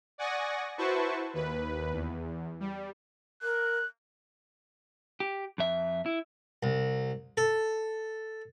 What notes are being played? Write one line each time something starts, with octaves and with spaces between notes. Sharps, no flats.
D5 F#5 G#5 C#6 D#6 A#6
E4 F#4 B4 C5 A5 C#6
D#2 B4
E2
G3
A#4 F#6
G4
F2 E5
E4
C2
A4